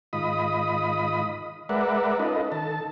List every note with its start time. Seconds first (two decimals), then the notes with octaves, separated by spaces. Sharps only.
0.13 G#2 D#3 F4 D#5 B5 D#6
1.69 G#3 A#4 B4 D5 E5 F#5
2.19 C#4 D#4 F4 A4 B4 D#5
2.52 D#3 A4 A5